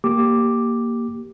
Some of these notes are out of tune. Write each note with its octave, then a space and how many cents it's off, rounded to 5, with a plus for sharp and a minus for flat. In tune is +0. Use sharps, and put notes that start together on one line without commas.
A#3 +0 G4 +0 D6 +0